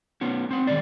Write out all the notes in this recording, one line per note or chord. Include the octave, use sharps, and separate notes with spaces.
B3 C#4 F#4
C4 F#5
D#3 E3 G#3 C#4 D5